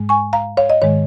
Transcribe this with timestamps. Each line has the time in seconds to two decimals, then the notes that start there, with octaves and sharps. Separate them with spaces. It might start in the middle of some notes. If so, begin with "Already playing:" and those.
Already playing: G#2 G#3
0.09 G#5 C#6
0.33 F5 A#5
0.57 C#5 F5
0.70 D#5
0.81 G#2 D#3 G#3 C#5